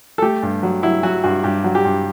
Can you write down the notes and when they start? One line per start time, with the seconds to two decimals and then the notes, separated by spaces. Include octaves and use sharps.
0.18 A4
0.22 A3 G4
0.43 G2
0.63 F#3
0.83 F#3 E4
1.03 F#3 F#4
1.24 G2 F#4
1.44 G2 G4
1.64 F#3
1.75 G4
1.85 G2